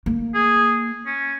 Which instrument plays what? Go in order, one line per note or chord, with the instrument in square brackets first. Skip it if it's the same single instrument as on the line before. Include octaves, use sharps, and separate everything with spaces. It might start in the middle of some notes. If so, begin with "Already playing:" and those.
[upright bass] A#3
[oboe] G#4
C#4